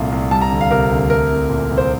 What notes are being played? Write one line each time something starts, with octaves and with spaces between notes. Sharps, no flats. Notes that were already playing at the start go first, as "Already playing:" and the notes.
Already playing: C2 A#2 A3 F5
C2
G3 A5
A#5
D2
F5
C3 A#4
D2
A3 A#4
C2
A#2
C2
C5